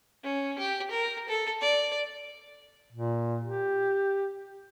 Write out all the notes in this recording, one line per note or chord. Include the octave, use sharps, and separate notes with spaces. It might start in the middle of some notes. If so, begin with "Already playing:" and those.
C#4
G4
A#4
A4
D5
A#2
G4